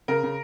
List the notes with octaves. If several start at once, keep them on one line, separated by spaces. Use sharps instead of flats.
C#3 A#4
C#3